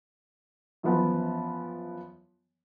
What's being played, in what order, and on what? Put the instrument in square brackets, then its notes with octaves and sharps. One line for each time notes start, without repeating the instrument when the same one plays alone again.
[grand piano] F#2 E3 F3 B3